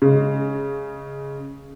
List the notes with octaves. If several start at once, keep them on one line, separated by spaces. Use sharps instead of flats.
C#3 G#3